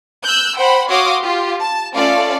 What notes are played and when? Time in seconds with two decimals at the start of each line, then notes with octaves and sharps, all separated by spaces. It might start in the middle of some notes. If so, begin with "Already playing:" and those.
0.24 E6 F#6 G6
0.58 C5 F#5 G5 B5
0.90 F#4 C#5 F5 C6 D6 D#6
1.21 F4 G4
1.60 A5
1.94 A3 C#4 F4 A4 D5 F5